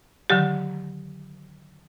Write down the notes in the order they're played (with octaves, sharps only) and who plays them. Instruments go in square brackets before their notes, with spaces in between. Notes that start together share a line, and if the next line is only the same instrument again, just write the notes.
[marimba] D3 D#3 F#3 G4